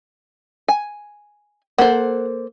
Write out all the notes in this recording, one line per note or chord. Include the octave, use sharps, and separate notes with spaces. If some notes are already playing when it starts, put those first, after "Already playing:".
G#5
A#3 A4 C5 F#5